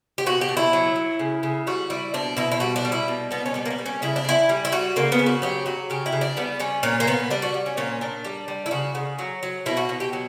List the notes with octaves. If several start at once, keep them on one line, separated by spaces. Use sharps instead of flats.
G4
B2 F#4
G4
B2
E4
F#3
F#3
C#3
C#3
G3 F#4
G3 E4
B2 D4
B2 E4
E4
G3 F#4
D4
G3
E4
B2
B2 B3
C#4
G3 B3
A#3
B3
G3
C#4
C#3 E4
D4
C#3 E4
G3
E4
G3 F#4
C#3 A#3
B3
C#3
F#4
F#3 G4
F#3 F#4
C#3 G4
E4
C#3
D4
G3 B3
G3 C#4
A#2 C#4
A#3
A#2 B3
G3 D4
F#4
G3
C#4
A#2 C#4
A#2 D4
G3
G3
E4
C#3 F#4
C#3
F#3
F#3
B2 E4
F#4
B2
G4
F#3